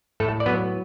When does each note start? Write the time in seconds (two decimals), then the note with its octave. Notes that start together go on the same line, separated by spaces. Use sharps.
0.20 A2 A3 A4
0.40 D5
0.46 F#3 B3 B4